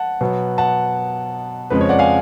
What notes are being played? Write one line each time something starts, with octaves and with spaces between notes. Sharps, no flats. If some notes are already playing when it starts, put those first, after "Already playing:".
Already playing: F#5 A5
B2 F#3 B3
F#5 A5
F2 C#3 G#3 B4
C#5
D5 F#5
F5 G#5